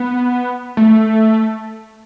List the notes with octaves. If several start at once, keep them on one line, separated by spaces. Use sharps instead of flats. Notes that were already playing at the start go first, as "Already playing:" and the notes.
Already playing: B3
A3